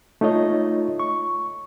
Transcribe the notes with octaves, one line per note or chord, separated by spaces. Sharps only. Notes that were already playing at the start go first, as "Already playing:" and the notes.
A3 D#4 F4 C#5 D#5
C#6